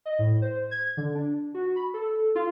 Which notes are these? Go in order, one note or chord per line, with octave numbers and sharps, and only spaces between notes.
D#5
A2
C5
G#6
D3
D4
F#4
B5
A4
F4